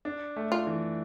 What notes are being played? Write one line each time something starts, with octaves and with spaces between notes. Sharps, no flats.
D4
A3
F4
E3